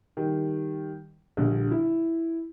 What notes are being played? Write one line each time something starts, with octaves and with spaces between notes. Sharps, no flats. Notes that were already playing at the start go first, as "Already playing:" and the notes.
D#3 G3
A#1 D3 G3
E4